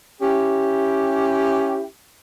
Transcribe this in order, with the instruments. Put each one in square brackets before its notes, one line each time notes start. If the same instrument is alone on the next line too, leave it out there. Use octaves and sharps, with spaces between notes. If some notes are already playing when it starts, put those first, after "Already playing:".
[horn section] C#4 E4 G4